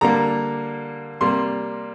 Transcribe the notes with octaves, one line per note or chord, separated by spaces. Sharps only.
D3 G3 A#3 A#5
C3 G3 A#3 C6